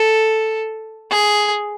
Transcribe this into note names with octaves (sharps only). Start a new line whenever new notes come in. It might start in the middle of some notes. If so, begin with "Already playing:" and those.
Already playing: A4
G#4